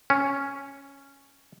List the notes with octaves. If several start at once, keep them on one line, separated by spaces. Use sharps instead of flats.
C#4